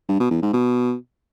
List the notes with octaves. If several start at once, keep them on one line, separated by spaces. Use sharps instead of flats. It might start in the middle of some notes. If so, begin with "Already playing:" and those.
G2
B2
E2
G#2
B2